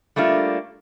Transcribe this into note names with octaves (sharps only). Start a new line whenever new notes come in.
G3 A3 A#3 D4 F4